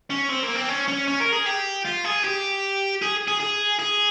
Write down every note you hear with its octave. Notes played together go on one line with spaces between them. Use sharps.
C#4
C4
A#3
C4
C#4
C#4
C#4
A#4
G#4
G4
F4
G#4
G4
G#4
G#4
G#4
G#4